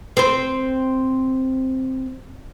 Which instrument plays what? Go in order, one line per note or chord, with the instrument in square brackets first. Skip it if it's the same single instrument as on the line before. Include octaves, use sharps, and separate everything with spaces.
[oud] C4 C5